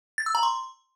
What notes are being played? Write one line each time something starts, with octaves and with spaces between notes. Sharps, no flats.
A6
E6
A#5
C6